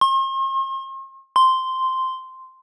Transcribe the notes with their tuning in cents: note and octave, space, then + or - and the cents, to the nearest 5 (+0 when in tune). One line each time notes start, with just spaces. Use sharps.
C6 +45
C6 -5